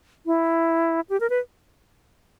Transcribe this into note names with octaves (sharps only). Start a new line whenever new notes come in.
E4
G4
A#4
B4